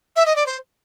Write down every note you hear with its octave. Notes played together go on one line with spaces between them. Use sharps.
E5
D#5
D5
C5